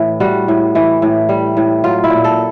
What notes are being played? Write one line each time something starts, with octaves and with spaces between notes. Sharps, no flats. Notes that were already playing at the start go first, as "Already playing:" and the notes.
Already playing: A2 E3
G3 F#4
A2
E3
A2
G3
A2
F#3 F4
E4
A#2
A4